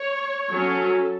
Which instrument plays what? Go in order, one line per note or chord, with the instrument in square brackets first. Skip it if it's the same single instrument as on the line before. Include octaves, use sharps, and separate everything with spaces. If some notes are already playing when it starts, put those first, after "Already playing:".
Already playing: [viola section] C#5
F#3 C#4 A4